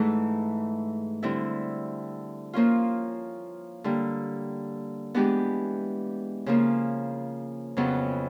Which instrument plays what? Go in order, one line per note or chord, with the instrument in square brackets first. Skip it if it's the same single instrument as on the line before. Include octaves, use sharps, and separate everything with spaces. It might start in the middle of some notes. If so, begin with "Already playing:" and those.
Already playing: [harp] G#2 E3 A3
D3 G3 C4 E4
F3 A#3 C#4 F4
D3 G3 A#3
E3 G#3 B3 D4 G4
C#3 F3 A#3
F2 C#3 F#3 B3